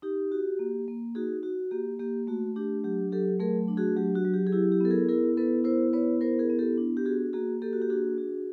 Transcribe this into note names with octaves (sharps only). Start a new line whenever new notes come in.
D#4 G4
F#4
A#3
A#3
D#4 F#4 G#4
F#4
A#3 G4
A#3 G4
A3 F#4
D4 G4
F#3 G4
F#3 G4 A4
A3 G#4 A#4
D4
F#4 G#4
F#3 G4
F#4
F#3
G4
G#4
E4 G4
G4
B3 A4
G#4 A#4
E4 G#4 A#4
B3 A4 B4
E4 A#4 C5
B3 B4 C#5
E4 A#4 C5
G#4 A#4
B3
G4 A4
D4
G4
F#4 G#4
A#3 F#4 G#4
A#3 G4 A4
F#4
G4
D4 F#4 G#4
F#4